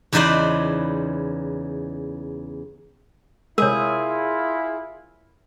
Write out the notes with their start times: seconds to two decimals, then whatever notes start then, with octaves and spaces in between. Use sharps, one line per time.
0.13 E2 C#3 D#4 B4 C5 D5
3.58 C3 G#3 E4 F4 G#4 A#4 C#5